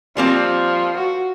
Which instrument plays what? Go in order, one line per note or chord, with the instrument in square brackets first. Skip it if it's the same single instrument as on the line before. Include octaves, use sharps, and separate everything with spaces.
[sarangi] F3 [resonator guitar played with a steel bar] G3 A#3 C4
[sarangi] F#4